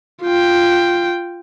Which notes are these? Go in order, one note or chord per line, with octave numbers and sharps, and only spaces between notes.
F4 G5